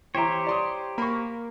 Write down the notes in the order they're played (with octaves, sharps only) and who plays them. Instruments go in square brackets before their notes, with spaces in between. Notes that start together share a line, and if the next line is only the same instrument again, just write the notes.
[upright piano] E3 E4 [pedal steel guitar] G4 C5 C#5 [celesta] G5 A#5
[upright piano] D5 C6 D#6
[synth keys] A#3 [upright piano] B5 C#6